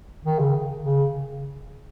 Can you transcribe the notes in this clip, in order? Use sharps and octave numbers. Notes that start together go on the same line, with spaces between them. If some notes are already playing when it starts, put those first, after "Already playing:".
D#3
C#3
C#3